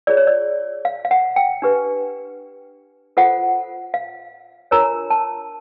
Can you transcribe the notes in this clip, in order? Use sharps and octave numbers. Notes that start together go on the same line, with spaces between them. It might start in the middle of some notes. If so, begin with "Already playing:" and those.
F4 G#4 C#5 D5
C#5
D5
F5
F5
F#5
G5
D4 G4 B4
F4 A4 C5 F#5
F5
D4 F4 A#4 C#5 A#5
A5